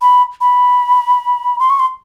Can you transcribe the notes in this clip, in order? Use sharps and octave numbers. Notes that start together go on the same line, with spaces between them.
B5
B5
C6
C#6
C6